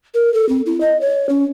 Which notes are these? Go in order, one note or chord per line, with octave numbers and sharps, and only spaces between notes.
A#4
A4
C4
E4
D#5
C#5
C#4